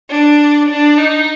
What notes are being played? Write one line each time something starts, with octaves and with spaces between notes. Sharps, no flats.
D4
D4
D#4